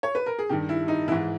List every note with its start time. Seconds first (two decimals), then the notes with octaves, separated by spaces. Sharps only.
0.03 C#5
0.15 B4
0.26 A#4
0.39 G#4
0.49 G2 D#3 G4
0.69 E4
0.88 D#4
1.08 E3 E4
1.12 G#2